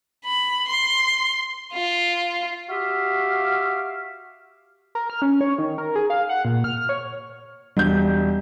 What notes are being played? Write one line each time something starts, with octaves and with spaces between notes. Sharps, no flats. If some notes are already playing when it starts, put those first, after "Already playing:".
B5
C6
F4
F#4 G4 E5 F5
A#4
F6
C#4
C#5
D#3
A#4
G#4
F5
F#5
A#2
F6
C#5
E1 G3 G6